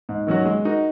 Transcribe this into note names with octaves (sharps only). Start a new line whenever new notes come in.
G#2
D#3 F#3 C#4 F#4
G#3
D#4 F#4 A#4